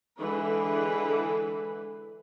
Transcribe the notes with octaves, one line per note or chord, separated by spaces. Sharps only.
D3 E3 G#3 B4